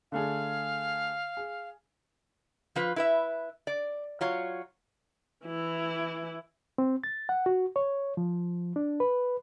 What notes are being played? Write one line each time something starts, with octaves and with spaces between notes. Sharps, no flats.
D3 A3 G#4 F5
G#4
F3 F4 B4
E4 B4 E5
D5
F#3 F4 C#5
E3 E4
C4
A6
F#5
F#4
C#5
F3
D4
B4